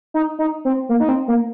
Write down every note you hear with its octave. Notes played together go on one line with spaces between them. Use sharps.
D#4
D#4
C4
A#3
D#4
C4
A#3